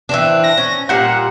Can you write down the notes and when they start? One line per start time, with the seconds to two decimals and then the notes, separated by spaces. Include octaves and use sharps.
0.09 E3 C4 D4
0.44 A#6
0.57 C#4
0.89 A#2 G3 F4 F#5